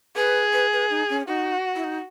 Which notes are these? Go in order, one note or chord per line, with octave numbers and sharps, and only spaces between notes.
G#4 B4
B4
B4
D#4
C#4
D#4 F#4
E4
D#4